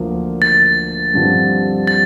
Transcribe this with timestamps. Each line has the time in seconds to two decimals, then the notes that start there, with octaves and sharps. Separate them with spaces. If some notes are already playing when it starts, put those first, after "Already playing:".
Already playing: D2 D3 F3 A#3
0.42 A6
1.14 G2 D3 F3 C4
1.87 A6